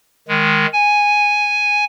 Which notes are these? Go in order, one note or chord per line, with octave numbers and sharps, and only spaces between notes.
D#3 G#3
G#5